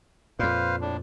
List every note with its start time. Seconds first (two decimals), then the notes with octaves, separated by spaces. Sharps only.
0.39 F2 A#2 B4 C5 F5
0.81 A2 D4